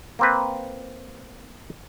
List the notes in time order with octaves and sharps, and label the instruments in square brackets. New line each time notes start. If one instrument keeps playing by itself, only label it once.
[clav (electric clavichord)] A#3 C4 B4